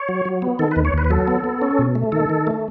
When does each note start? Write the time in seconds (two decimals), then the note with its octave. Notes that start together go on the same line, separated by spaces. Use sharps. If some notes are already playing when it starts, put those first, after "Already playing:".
Already playing: C#5
0.09 F#3
0.25 F#3
0.42 B3
0.59 D#3 A4
0.71 B4
0.76 D#2
0.85 C#5
0.94 D#2 B4
1.04 B4
1.10 F#3 A4
1.28 B3
1.44 B3
1.62 C#4
1.79 B2
1.95 A3
2.12 D#3 A4
2.29 D#3
2.47 A3